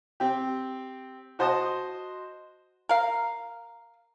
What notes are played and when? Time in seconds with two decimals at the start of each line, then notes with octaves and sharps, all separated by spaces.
0.20 C4 G4
1.39 F#4 C5 D#5 A5 D#6
2.89 A#4 F5